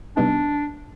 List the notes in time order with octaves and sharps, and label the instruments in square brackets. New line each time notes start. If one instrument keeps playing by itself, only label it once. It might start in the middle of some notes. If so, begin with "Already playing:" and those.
[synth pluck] C3 G3 B3 D#4 [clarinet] D4